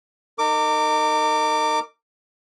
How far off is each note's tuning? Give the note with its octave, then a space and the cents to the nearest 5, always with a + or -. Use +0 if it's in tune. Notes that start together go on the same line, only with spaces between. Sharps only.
D#4 -15 A#4 -30 D6 +0